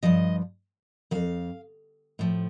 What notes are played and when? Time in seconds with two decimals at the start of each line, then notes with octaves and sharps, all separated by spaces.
0.03 G2 F3 D#5
1.11 F2 D#3 F5
2.19 A2 F3